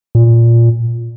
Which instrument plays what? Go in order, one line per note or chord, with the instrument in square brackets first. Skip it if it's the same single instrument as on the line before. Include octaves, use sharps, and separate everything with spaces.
[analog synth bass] A#2